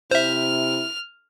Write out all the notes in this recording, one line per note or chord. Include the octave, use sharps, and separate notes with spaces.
C3 E4 C5 E5 F6